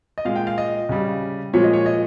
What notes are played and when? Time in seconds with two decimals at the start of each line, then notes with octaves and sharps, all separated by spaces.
0.18 D#5
0.25 A#2 G#3 F5
0.36 G5
0.47 F5
0.58 D#5
0.89 C#3 G3
1.53 A#2 F3 G#3 C#5
1.64 D#5
1.73 C#5
1.86 D#5